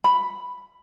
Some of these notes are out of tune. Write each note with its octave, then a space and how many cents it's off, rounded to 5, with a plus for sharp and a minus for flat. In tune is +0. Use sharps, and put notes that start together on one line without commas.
B5 +5